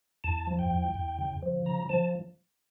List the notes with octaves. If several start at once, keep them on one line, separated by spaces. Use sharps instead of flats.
E2 A5
F3
G5
E2
E2
C#3
F3
C#3 A#5
F3 A5